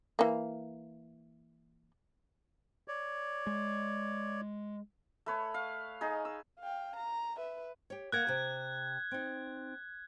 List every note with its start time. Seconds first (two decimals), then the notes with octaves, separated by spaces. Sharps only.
0.19 E3 A#3
2.88 C#5 D5
3.47 G#3
5.26 A3 B4 C#5
5.54 F5
6.01 D#4 G#4
6.25 E6
6.60 F5 G5
6.97 A#5
7.37 B4 E5
7.90 G4 C#5
8.12 A#3 A#4 F#5 F#6 G#6
8.27 C3 G4
9.11 C4 D#4